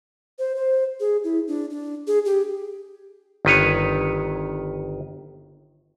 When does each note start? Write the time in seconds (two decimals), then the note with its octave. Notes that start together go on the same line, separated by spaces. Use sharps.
0.39 C5
0.56 C5
1.00 G#4
1.24 E4
1.48 D4
1.70 D4
2.07 G#4
2.25 G4
3.45 G1 D#3 B4 C#5